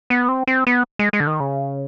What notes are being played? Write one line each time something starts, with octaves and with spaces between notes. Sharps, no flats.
B3
C4
C4
B3
G#3
G#3
D3
D#3
C#3